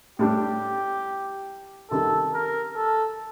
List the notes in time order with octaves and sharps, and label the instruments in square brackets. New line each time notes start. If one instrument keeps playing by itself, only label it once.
[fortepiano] A2 G3 D4 [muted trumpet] G4
[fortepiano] C3 D#3 G3 [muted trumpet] A4
[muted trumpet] A#4
A4